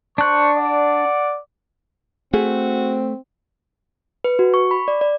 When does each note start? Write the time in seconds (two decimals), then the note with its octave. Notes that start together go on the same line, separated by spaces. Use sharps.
0.18 D4 C5 C#6 F#6
0.57 D5 F#5
2.33 A3 C4 F#4 G#4
4.24 B4
4.39 F#4
4.54 C#6
4.71 B5
4.88 D5
5.01 D5